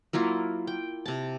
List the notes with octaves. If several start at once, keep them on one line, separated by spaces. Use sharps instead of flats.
F#3 A#3 E4 F4
G5
C3 A5